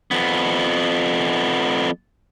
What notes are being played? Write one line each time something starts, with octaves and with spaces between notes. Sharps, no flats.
F2 B3